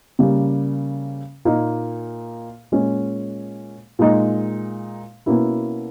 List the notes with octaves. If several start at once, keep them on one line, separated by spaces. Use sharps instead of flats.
C#3 G3 A#3
A#2 A#3 D#4
A#2 G#3 C#4
A#2 G#3 D#4
B2 A#3 C#4 E4